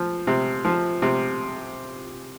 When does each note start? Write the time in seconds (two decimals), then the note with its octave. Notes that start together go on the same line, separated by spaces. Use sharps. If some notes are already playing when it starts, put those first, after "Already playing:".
Already playing: F3
0.27 C3
0.65 F3
1.02 C3